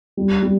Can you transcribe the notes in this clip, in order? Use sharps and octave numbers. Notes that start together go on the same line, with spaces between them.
G3
G3